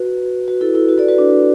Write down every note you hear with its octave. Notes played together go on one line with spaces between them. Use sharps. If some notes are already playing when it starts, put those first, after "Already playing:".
Already playing: F#4 B4
F#4 B4
E4 A4
E4 A4
F#4 B4
A4 D5
F#4 B4
D4